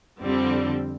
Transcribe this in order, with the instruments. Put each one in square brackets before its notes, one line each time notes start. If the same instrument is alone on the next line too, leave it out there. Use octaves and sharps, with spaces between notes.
[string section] F2 D3 G3 C4